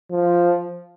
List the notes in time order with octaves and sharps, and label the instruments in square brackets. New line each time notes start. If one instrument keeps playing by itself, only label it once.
[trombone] F3